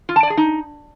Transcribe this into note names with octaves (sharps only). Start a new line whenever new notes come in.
F4
A5
D5
G#4
D#4